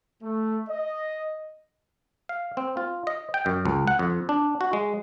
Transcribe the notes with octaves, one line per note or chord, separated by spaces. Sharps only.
A3
D#5
F5
C4
F4
D#5
G5
F#2
C#2
F#5
F2
D4
F#4
G#3